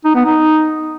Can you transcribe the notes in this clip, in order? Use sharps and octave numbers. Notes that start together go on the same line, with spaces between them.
D#4
B3
D#4